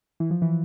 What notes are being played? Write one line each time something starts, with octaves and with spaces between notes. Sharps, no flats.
E3
F3
E3